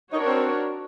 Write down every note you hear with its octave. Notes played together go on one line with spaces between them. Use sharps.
D4 D#4 F#4 A#4 C#5
C4